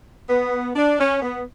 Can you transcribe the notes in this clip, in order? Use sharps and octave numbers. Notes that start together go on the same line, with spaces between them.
B3
D4
C#4
B3